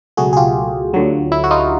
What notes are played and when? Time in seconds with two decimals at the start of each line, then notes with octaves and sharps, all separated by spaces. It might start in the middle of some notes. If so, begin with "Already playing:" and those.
0.17 C#2 B2 F#3 A3 F#4 G#4
0.33 G#4
0.37 F4 G4
0.94 D2 D3 F#3
1.32 E4
1.44 F#4
1.51 D#4 F4